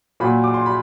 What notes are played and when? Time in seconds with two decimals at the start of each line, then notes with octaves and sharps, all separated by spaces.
0.20 A#2 F#3 B5
0.44 D6
0.54 C6
0.66 B5